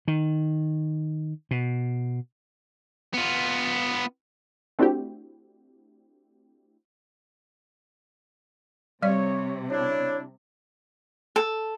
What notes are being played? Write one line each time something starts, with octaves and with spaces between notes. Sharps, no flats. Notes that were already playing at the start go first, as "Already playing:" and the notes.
D#3
B2
B3 F4
A3 C4 D4 E4 F#4 G4
C3 G3 C#5 D5
D4 E4 C#5
A4